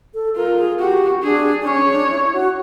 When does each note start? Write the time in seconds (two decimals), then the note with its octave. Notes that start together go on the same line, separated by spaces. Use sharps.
0.14 A4
0.36 F4 A#4
0.58 G#4
0.79 F#4 G4
1.23 D4 G#4
1.61 D4
1.66 C#4 C#5
1.89 D4
2.10 E4
2.33 F#4